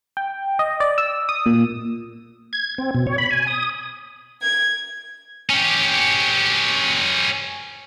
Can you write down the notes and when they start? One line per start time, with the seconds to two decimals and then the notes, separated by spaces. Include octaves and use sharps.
0.17 G5
0.59 D#5
0.80 D5
0.98 E6
1.29 D#6
1.46 A#2
2.53 G#6
2.78 C4
2.95 B2
3.07 C#5
3.18 B5
3.31 G#5
3.47 D#6
4.43 G#6
5.50 C#4 G4